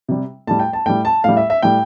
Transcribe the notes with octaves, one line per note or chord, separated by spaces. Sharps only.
C3 G3
A2 G3 A5
G5
A5
A2 G3 G5
A5
A2 G3 F5
E5
E5
A2 G3 G5